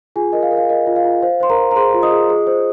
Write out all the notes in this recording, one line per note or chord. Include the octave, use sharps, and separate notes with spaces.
F4 G#4 G#5
A#4 D#5
F5
A#4
F5
A#4 D#5
F4
F5
F4
C5 F5
C5 C6
A#4 A#5
C5
A#5
G#4 C5 C6
F4
D#5 D#6
G#4
G#4
C5